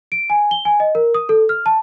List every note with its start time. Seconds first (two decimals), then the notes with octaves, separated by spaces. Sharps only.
0.12 D7
0.30 G#5
0.51 G7
0.65 G#5
0.80 D#5
0.95 A#4
1.14 D#6
1.29 A4
1.49 F6
1.66 A5